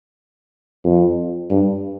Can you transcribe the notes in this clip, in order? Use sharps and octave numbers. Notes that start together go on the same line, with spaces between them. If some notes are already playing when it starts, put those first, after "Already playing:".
F2
G2